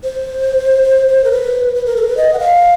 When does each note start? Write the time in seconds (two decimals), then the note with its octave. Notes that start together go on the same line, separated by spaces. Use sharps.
0.04 C5
1.24 A#4
1.32 B4
1.75 B4
1.86 A#4
1.96 A4
2.02 A#4
2.07 B4
2.17 D#5
2.33 F#5
2.39 F5